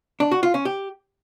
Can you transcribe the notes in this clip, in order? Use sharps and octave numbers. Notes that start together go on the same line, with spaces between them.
D4
F#4
F4
C#4
G4